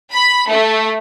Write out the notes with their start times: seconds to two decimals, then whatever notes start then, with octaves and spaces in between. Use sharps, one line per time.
0.13 B5
0.49 A3